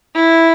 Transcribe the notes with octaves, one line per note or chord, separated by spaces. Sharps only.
E4